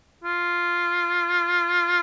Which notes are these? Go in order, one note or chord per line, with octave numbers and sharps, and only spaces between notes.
F4